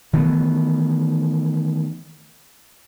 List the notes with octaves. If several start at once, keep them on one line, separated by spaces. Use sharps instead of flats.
D#3 E3 A3 B3